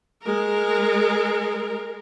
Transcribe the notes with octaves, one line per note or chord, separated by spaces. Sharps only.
G#3 A#4